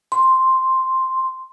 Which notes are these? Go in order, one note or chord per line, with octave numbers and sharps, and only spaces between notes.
C6